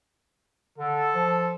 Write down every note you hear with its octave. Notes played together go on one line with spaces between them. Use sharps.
D3 A4
F3